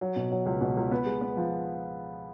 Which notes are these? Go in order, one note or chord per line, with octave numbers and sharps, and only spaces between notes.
F#3
B2
F#3
C#2
B2
C#2
B3
G#3
B3
F3